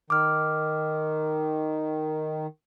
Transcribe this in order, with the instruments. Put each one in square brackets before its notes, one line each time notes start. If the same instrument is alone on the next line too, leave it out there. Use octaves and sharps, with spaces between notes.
[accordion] D#3 [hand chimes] D6 F6